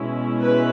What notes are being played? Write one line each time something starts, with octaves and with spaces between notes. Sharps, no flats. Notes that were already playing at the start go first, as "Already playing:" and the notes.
Already playing: B2 G#3 C#4 E4
B4